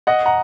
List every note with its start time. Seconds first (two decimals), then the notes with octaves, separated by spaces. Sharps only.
0.07 D#5 F#5
0.26 F#5 A#5